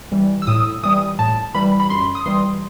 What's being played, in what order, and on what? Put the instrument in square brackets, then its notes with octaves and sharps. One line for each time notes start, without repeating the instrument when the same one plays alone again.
[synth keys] E3 G3
E6
A2 D#6
E3 G3 D#6
A2 A5
E3 G3 B5
B5
F#2 C6
D#6
E3 G3 C6